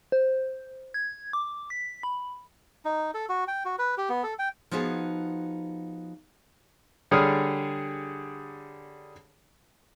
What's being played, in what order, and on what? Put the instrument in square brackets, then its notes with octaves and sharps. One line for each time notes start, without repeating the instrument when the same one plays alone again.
[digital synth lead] C5
G#6
D6
B6
B5
[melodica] D#4
A4
F#4
G5
F#4
B4
G4
B3
A4
G5
[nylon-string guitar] F3 B3 D#4 F#4 G#4
[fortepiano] D3 G3 G#4 C#5 D#6 F6